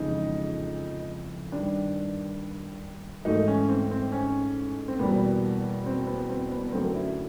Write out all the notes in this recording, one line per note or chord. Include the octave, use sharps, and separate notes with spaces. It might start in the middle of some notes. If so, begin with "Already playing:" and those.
Already playing: F2 C#3 E3 G#3 D#4
G2 D#3 G3 D4
G#2 E3 A3 D#4
C#4
C4
C4
C#4
C4
E2 B2 G3 A#3 B3
C4
B3
C4
B3
F#2 D3 F#3 A3 C4
E4